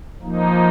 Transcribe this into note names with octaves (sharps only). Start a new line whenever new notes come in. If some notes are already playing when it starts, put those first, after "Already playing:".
F3 A#3 D#4